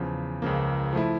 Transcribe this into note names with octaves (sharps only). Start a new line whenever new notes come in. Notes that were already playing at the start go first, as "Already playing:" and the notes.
Already playing: E2 C#3 F3
C#2 C#3 F3 A#3
F3 A3 E4